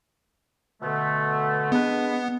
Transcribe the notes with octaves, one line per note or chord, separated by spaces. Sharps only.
B2 D3 A3
G#3 B3 D4 B4